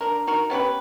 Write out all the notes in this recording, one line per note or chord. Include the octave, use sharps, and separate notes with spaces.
D4 A#4
D#4 F#4 A#4
B3 C#4 G4 B4